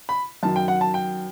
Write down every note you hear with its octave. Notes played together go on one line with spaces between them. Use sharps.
B5
F#2 D#3 F#3 A5
G5
F#5
A5
G5